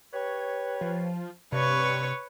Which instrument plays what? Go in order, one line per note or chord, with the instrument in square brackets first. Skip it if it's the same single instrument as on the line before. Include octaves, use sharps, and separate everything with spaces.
[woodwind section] G4 B4 C#5
[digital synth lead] F3
[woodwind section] G2 [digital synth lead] C3 [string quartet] B4 C#5 C#6